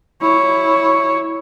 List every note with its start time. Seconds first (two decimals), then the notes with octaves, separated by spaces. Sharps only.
0.22 E4 C#5